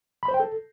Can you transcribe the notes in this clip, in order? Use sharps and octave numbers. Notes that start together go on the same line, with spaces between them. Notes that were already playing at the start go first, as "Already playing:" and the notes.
B5
C5
G5
A4